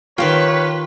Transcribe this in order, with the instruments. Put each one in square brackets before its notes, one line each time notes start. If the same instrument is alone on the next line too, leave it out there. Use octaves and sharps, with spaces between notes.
[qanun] D#3 G4 G5 [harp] F4 [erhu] B4 [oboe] C#5